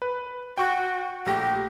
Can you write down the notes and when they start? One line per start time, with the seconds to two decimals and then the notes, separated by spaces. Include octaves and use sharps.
0.02 B4
0.58 F#4 G5 C#6 F#6
1.26 A#1 A3 G4 A#6